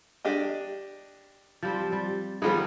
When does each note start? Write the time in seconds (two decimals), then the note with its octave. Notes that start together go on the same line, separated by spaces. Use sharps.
0.25 D4 G4 D#5
1.62 F3 G3 C4
1.92 G3
2.42 D#3 F3 G3 A#3 B3 G#4